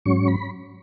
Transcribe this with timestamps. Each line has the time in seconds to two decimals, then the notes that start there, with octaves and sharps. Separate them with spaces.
0.06 G#2 F#3 C#4 C#6
0.28 B5